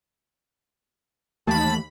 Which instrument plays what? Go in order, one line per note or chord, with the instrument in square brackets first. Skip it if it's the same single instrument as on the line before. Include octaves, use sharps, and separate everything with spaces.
[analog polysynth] D#2 B5 [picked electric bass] E3 A3 A#3 [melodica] A5